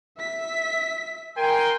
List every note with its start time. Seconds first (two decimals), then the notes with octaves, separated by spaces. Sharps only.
0.18 E5 B6
1.37 A#4 G5 G#5 C6